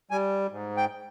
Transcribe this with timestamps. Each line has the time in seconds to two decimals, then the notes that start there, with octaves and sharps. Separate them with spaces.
0.11 G3 G#5
0.50 G#2
0.77 G5